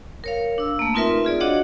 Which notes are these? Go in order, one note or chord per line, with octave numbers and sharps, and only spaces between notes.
A#4 C#5 F5
D4 E6
A3 A#3
C4 D#4 F4 A#4 B4 E5
F4 G#4 D5
D4 F#4 C#5 D#5 F5 F#5